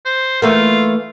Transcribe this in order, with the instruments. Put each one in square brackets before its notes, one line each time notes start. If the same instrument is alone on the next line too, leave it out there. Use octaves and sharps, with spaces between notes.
[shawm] C5
[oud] E3 A3 A#3 [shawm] F4